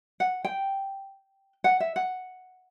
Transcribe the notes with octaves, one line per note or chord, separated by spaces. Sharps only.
F#5
G5
F#5
E5
F#5